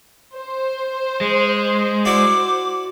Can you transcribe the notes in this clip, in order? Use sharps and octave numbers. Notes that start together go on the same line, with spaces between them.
C5
G#3
E4 F#4 D5 D6